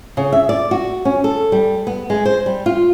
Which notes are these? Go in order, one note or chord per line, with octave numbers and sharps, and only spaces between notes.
C#3
E5
D5
F#4
C#4
A4
G3
B3
G#3
C5
G3
F4